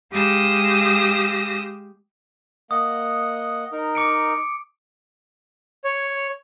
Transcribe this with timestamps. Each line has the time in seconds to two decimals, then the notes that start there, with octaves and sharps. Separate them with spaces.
0.10 G#3 G4 F5 D#6 E6 A#6
2.71 A#3 D#5 F#5 D#6
3.72 D#4 A#4
3.95 D6 C#7 D7
5.84 C#5